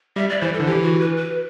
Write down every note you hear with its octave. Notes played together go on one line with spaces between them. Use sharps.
G3 E5
D5
E3 C5
A4
D3
E3 G4
F#4
B4
B4